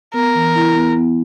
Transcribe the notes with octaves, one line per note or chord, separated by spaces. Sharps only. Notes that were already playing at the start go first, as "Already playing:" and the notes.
B3 A#4
E3
E4
B3
B3